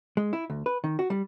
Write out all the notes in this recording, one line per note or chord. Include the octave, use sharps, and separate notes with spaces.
G#3
E4
D2
B4
D#3
F#4
G3